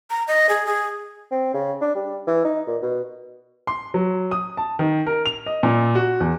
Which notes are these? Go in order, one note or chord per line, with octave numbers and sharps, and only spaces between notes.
A#5
D#5
G#4
G#4
C4
C#3
D4
G3
E3
D#4
A#2
B2
C6
F#3
D#6
A5
D#3
A#4
F7
D#5
A#2
F#4
E2